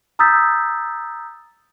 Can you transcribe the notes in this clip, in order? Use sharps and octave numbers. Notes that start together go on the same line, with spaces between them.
A#5 D#6 E6 G6 A6 B6